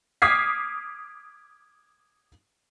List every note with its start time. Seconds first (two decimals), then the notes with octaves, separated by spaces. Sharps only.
0.22 D6 D#6 F6 G#6 B6 C7